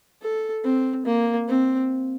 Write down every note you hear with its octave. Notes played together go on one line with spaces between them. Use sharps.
A4
C4
A#3
C4